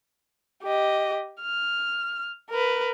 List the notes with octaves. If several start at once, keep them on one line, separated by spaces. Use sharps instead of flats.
G4 D#5
F6
A#4 B4